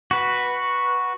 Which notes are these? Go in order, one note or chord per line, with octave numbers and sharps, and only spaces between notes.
F#4 B4